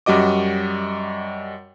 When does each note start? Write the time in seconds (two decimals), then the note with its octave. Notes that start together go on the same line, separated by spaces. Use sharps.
0.06 F#2 G3 F#4 D#5 D6